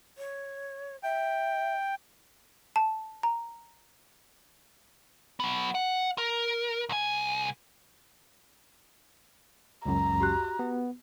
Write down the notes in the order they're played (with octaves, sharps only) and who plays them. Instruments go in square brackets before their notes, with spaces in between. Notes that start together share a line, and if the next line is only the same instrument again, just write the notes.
[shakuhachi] C#5
[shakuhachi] E5 [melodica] G5
[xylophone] A5
A#5
[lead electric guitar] F#3 B3
F#5
A#4
C2 G#5
[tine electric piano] C#2 F#2 [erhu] A#5
[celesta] F#4 G4 F#6
[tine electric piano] B3